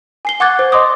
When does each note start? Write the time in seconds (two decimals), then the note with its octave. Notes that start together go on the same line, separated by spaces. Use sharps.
0.25 G#5 C7 G7
0.40 F#5 C#6 D6 F#6 G#6 A6
0.59 C5
0.72 D#5 C6 D6 D#6